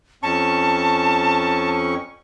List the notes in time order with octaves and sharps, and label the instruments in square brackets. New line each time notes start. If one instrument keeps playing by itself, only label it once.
[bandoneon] F2 C#4 C#6 [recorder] A5